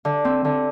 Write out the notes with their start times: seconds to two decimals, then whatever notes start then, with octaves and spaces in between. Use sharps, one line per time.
0.05 D3
0.25 C4
0.45 D3